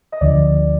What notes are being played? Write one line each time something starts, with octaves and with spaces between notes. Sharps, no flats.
D#5
D2 D3 F3 D5